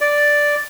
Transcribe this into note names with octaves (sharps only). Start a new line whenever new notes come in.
D5